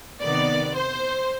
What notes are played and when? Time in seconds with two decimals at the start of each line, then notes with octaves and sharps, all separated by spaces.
0.22 C3 D#3 B3 D5
0.75 C5